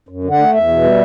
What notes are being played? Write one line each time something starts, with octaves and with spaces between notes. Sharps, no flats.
F#2
D3
F#5
A3
E2 E5
B2
G3